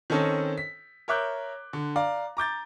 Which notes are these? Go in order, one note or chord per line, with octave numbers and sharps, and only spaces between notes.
D#3 C4 C#4 A4 C#5 D#5
B6
A#4 C#5 E5 D6 F#6 G6
D3
D5 F5 A#5
A#5 D6 G6 A6